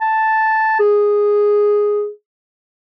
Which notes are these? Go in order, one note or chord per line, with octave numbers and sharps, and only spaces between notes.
A5
G#4